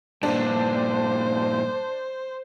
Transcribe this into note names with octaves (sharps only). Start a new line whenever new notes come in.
G2 A#2 D4 C5